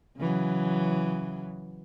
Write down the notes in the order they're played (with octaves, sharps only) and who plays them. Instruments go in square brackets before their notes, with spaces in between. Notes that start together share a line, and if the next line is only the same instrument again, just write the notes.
[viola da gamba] C#3 E3 F#3